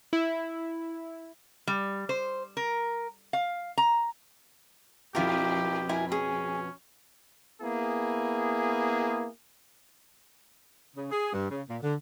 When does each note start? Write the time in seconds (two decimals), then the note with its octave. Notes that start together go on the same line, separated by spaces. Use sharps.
0.13 E4
1.67 G3
2.09 C5
2.57 A#4
3.33 F5
3.78 A#5
5.15 F2 B2 E4 F4 G4 A#4
5.89 E4 A#4 G#5
6.12 C#4 G#4
7.62 A#3 B3 E4 G#4
10.96 C#3
11.12 G#4
11.32 G2
11.50 C#3
11.69 A#2
11.83 D3